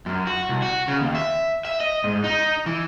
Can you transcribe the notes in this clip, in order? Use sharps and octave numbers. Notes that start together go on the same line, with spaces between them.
F#2
F#4
C2
F#4
C#3
D#2
E5
E5
D#5
G#2
D#4
E3